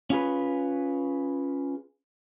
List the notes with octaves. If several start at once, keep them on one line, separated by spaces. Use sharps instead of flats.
C#4 F4 G#4 B4